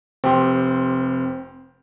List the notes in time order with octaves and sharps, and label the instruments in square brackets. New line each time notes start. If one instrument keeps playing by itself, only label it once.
[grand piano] F1 G4 C6 [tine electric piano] C4